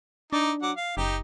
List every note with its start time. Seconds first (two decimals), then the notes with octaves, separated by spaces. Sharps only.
0.33 D4 D#4 D6
0.62 F#3 F#5 D6
0.76 F5
0.97 F#1 D#4 G4